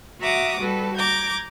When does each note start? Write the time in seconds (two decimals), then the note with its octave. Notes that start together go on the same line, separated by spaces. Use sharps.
0.20 F#4 E5 F#5 A#5 D6 D#6
0.60 G3 F#4 A4 B4
0.98 A#5 D6 G6 G#6